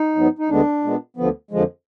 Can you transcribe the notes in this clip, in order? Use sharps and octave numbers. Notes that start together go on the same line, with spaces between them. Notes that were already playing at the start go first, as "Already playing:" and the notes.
Already playing: D#4
G#2 F#3 B3
D#4
D2 D3 G#3 B3 D4
A#2 G#3 B3
D2 D3 F3 B3
F2 D3 F3 G#3